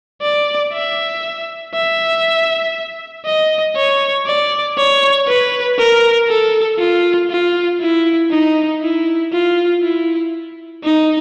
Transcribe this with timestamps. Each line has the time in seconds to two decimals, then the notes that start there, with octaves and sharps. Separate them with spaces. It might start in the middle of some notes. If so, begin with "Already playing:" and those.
0.22 D5
0.73 E5
1.74 E5
3.25 D#5
3.76 C#5
4.26 D5
4.77 C#5
5.27 B4
5.78 A#4
6.28 A4
6.79 F4
7.30 F4
7.81 E4
8.31 D#4
8.82 E4
9.33 F4
9.82 E4
10.84 D#4